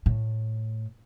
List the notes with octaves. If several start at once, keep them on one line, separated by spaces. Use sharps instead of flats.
A2